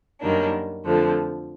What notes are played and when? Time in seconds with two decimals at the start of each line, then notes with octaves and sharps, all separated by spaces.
0.21 F#2 D#3 G3 A#3 D4
0.85 F2 D3 F3 A3